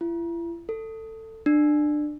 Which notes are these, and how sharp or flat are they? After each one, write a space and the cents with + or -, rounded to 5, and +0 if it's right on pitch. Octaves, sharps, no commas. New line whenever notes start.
E4 +40
A4 +20
D4 +25